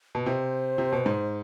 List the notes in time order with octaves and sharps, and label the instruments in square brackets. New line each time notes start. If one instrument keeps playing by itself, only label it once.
[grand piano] B2
[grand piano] C3 [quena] C5
[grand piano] C3
B2
G#2